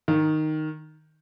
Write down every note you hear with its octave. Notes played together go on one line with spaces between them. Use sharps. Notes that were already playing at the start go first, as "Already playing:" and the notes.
D#3